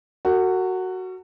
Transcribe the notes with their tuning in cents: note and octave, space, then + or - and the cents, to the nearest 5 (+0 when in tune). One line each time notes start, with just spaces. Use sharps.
F#4 +5 A#4 -45